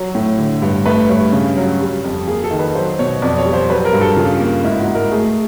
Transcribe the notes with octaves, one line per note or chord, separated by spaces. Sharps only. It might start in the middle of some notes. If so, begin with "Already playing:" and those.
Already playing: F#3
A2
D3
G2
A3 B4
G2 C#5
C#3
F#3
G3
F2
A#3 G#4
A4
D#3
B4
F#3 C5
B2 C#5
F2 D5
C#5
G3
C5
F#3 B4
A#4
G2
A4
C#3 F4
A#3
G#2 E4
F#4
G#2
A#4
A3 G#4